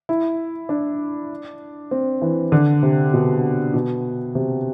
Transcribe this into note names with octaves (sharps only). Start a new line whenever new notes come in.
E4
D4
C4
E3
D3
C3
B2
B2
C3